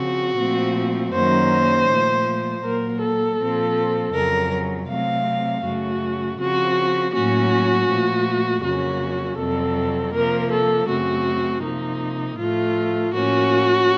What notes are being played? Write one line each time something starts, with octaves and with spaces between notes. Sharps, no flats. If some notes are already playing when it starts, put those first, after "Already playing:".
Already playing: C#3 F3 C4 F#4
A#2 F3 A3 C4
F#2 D#3 F#3 A#3 C#4 C5
A#2 F3 A3
A#2 F#3 A#3 A#4
A4
A#2 F3 C4
F2 C#3 F#3 A#4
C3 F#3 A3 C4 F5
F#2 C#3 A3 F#4
C#3 F3 C4 F#4
A2 F#3 A#3 C#4 F#4
A#2 F3 A3
F2 C#3 F#3 A#3 C#4 F#4
F2 C3 F#3 C4 A4
C3 F3 A#3 A#4
A4
F#2 C#3 A3 C4 F#4
C3 F3 A#3 D#4
A2 F3 A3 F4
A2 F3 A#3 C#4 F#4